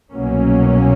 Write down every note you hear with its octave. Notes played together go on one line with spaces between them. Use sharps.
C2 B2 F#3 A#3 C#4